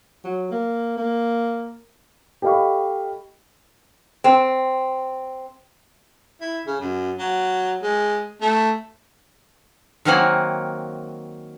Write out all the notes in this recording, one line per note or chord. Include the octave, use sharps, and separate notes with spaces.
F#3
A#3
A#3
G4 A4 D#5 F5 B5 C#6
C4
E4
C#3
F#2
F#3
G#3
A3
D#3 F#3 A#3 C4 F#5 G#5